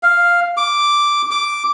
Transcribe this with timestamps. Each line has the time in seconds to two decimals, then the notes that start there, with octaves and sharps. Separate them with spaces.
0.03 F5
0.57 D6
1.31 D6